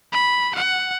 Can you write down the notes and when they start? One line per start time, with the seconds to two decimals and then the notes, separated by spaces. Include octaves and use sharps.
0.13 B5
0.55 F#5